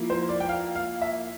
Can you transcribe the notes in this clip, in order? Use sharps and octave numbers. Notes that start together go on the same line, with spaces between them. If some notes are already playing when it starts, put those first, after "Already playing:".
Already playing: F3 A#3 E4
C5
D5
G5
F5
F5
E5